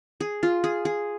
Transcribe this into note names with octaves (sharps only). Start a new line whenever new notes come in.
G#4
F4
G#4
G#4